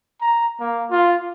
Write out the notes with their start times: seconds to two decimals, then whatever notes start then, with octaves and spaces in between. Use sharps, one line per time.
0.21 A#5
0.60 A#3
0.91 F4